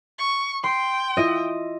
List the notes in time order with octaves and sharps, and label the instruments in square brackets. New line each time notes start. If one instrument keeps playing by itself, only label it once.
[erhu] C#6
[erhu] G5 [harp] C6
[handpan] E4 F4 E5 [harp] D#5